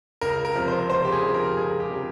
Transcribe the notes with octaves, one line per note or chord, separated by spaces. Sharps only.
C#2 A#4
A#4
C3 F3
C5
C#2 C5
G4
G#4
C3 F3
A#4
C#2 G#4
G4
C3 F3